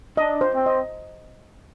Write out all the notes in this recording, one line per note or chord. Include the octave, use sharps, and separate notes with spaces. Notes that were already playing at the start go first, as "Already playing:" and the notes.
D4 D#5
C5
C4
D#5